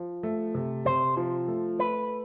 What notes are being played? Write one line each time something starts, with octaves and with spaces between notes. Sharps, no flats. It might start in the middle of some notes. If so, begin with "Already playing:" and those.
Already playing: F3
A3
C3
C3 C5
F3
A3
A3 B4